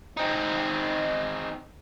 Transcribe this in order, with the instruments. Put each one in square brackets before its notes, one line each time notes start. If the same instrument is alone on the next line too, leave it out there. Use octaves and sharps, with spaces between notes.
[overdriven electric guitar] C4 D#4